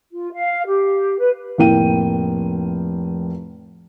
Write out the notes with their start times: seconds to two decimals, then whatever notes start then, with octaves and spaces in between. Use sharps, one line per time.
0.12 F4
0.33 F5
0.66 G4
1.19 B4
1.58 F1 A2 A#3 G5 D#7